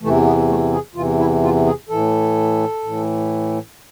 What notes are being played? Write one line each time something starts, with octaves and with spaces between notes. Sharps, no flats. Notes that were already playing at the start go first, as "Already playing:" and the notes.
E2 C3 E3 A3
B3
A3
G#4
E2 C3 E3 F4
E4
F4
G#4
A2 E3 A4
A2 E3